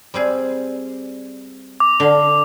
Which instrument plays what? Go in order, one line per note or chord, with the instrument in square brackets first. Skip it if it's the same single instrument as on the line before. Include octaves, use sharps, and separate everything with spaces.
[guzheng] G3 C4 G#4
[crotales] D6
[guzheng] D3 F5